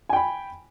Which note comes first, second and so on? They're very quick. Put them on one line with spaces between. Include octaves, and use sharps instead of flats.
G#5 G5 B5